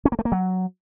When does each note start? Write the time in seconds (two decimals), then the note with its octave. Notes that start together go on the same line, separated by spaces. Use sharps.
0.05 C#4
0.12 A#3
0.19 A3
0.25 A#3
0.32 F#3